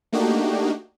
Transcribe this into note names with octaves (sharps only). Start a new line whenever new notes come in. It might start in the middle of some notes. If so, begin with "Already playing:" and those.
A3 A#3 D4 D#4 F#4 G4